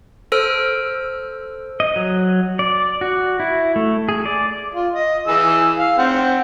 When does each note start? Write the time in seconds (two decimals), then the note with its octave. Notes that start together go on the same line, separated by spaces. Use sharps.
0.32 A4 C5 E6 F6 D7
1.80 D#5
1.96 F#3
2.59 D5
3.01 F#4
3.40 E4
3.76 A3
4.09 G#4
4.25 D5
4.75 F4
4.94 D#5
5.27 E3 G#4 E6
5.77 F5
5.98 C4 F#5